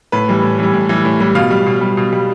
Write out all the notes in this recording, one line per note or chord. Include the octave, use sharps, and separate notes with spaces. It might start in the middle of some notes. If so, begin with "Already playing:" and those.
A2 B4
E3 G3
A2
E3 G3
A2
E3 G3
A2
E3 G3
B2 F5
G3
B2
G3
B2
G3